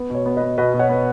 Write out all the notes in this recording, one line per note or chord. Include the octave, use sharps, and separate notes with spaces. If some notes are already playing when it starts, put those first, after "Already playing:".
Already playing: B3
B2 C#5
B3
B4 D#5
B3
B2 B4 D#5
B2
C#5 F#5
B3